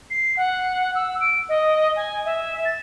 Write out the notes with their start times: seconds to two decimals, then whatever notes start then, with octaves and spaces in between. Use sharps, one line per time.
0.10 C7
0.37 F#5
0.95 E6
1.21 D7
1.49 D#5
1.96 G#5
2.25 E5
2.65 A6